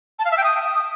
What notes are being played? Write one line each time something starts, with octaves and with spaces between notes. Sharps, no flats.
A5
F5
E5
G5
D#6